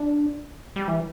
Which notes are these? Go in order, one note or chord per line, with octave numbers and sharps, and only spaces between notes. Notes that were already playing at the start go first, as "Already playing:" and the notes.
Already playing: D4
G3
E3